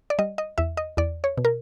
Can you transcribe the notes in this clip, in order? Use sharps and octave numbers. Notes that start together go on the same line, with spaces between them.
D5
G3 D#5
D#5
E2 E5
D#5
E2 D5
C#5
B2
A#4